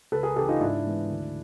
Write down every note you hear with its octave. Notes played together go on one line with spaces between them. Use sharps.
C#2 A4 B4
G#4 A#4
C#3 E3 G4 A4
D#4 F4
G#2 D4 E4
E3 G#3 B3
D2